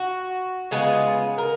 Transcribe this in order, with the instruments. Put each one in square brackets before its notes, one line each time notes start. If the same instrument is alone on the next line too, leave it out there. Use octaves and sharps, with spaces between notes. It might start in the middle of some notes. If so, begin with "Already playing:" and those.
Already playing: [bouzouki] F#4
C#3 G#3 B3 F4 G#4
A#4